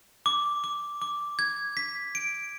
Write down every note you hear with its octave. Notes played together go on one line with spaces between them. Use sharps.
D6
D6
D6
G#6
B6
D7